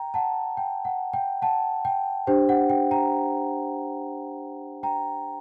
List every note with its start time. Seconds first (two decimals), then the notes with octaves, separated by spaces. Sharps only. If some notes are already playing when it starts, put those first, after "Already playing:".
Already playing: G5 A#5
0.14 F#5 A5
0.57 G5
0.85 F#5
1.13 G5
1.42 F#5 A5
1.85 G5
2.27 D4 G4 C5 G5
2.49 F#5
2.70 G5
2.91 G5 A#5
4.83 G5 A#5